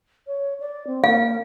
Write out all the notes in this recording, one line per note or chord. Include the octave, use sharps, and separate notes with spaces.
C#5
D5
C4
A#3 F5